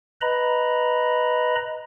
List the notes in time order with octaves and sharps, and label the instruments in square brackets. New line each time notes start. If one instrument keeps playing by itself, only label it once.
[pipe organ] B4 D#5 A#5 B5